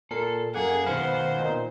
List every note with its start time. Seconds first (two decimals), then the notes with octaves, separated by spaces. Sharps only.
0.11 A#2 A4 A#4 C7
0.54 F#2 A#3 G#4 F#5
0.86 B2 D#3 B4 C5 F5 F#5 F#6
1.39 A#2 D#4